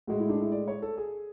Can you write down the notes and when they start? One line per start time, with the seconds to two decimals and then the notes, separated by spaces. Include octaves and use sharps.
0.07 A2 G#3 F#4
0.19 E4
0.29 D4
0.41 E4
0.52 D5
0.68 C#5
0.82 A4
0.97 G#4